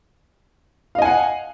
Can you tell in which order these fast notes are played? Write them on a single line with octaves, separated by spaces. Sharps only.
F5 D#5 G#5 F#5